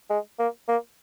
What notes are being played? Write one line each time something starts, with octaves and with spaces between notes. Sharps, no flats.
G#3
A#3
A#3